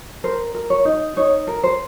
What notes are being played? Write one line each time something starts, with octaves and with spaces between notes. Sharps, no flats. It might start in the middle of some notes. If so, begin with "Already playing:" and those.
A#4 C5
A#4
C#5
D#4
D#4 C#5
A#4
C5